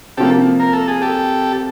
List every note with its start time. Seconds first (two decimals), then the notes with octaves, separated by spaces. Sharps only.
0.17 C3 F3 A#3 G4 A4
0.60 A#4
0.73 A4
0.88 G#4
1.02 G4 A4